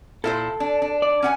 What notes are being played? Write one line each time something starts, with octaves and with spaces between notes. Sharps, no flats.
A#2 E4 A4 C5
D4
D4
D5
C#4 F#5 G#5